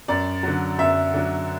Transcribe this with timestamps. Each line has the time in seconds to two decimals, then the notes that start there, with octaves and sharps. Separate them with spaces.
0.08 F#2 D5
0.43 D3 F#3
0.78 F#2 E5
1.14 D3 F#3